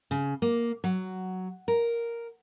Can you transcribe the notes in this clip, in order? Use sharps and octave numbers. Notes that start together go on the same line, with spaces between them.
C#3
A#3
F#3
A#4